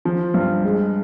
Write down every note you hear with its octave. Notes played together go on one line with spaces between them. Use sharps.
F3
G2
G#3